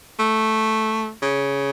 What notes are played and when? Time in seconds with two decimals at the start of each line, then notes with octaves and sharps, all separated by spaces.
0.19 A3
1.22 C#3